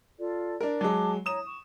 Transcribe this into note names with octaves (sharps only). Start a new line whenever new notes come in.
F4 A4 D5
D4 A#4
F#3 G#3 A5 D6
C#5 A#5 D#6 E7
C#6